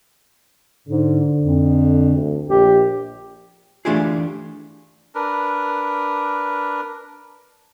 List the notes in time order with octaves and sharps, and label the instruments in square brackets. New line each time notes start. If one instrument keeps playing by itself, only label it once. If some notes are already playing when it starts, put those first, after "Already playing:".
[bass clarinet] G#2 [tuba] D3
[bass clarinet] F2
[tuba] D2
[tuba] A#1 [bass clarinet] G4
[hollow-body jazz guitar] E3 A3 D4 F4 G4 G#4
[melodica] D4 A#4 B4